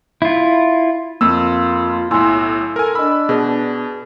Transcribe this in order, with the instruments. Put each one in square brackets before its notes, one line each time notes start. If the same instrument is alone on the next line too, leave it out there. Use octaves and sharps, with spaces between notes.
[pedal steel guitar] E4 F4
[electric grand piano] F2 E6 [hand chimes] A#3 [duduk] F4
[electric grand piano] B1 A2 [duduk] E4 [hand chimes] G#5 C6 E6
[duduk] A4 [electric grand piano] A#4 G#5
[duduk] D4 [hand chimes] D#5 E6 [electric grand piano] B5
[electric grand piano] B2 [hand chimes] G#4 B4